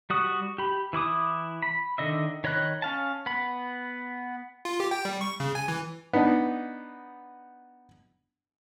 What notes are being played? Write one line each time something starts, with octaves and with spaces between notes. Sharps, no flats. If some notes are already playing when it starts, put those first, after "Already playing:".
G3 F#4 D#6
G4 B5
E3 E4 D6 D#6
B5
D3 D#3 D#5 E5
D#3 C#5 D#5 B5 F#6
C#4 F5 A5
B3 B5
F4
G4
G5
G3
C#6
C#3
G#5
E3
B3 D4 D#4